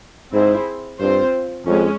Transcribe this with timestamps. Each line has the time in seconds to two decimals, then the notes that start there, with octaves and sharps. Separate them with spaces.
0.32 G#2 C4 E4 G#4 C5
1.00 G2 C4 F4 C5
1.66 F2 G#3 C#4